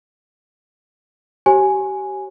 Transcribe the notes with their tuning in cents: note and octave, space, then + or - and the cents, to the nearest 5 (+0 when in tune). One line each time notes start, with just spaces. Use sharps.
G4 -30 C#5 -40 G#5 +0